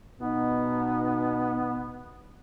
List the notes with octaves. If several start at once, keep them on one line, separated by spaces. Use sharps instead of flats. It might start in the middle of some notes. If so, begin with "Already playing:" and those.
B2 B3 D#4